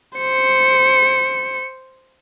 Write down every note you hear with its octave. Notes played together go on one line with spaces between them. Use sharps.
C5 C#7